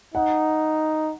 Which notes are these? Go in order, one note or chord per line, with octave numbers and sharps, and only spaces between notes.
D#4 F#5